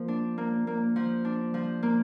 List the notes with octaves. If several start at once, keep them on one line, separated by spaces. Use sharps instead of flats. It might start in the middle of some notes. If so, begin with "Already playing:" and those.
Already playing: F3 A#3
D4
A#3
A#3
F3
D4
F3
A#3